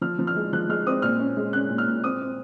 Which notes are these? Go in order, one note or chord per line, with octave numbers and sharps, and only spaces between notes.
F3 F6
F3
F6
G#3
F3 F#6
G#3 F6
C4 D#6
A#2 F6
C#4
G#3
C#4 F#6
A#2
F6
A#2
C4 D#6
C4